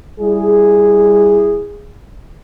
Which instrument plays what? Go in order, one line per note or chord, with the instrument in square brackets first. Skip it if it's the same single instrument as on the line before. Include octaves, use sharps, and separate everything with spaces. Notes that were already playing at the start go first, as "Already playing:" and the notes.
[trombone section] G3 E4 G#4